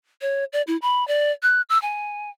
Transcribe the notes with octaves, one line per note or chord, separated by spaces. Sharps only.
C#5
D5
E4
B5
D5
F#6
E6
G#5